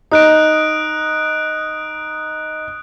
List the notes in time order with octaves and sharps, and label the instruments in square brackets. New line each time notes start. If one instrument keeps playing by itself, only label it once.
[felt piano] D#4 [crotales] D#6 F#6 D7